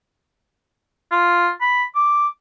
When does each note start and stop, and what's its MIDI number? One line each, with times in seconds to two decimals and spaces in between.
1.11 1.49 65
1.61 1.84 83
1.95 2.27 86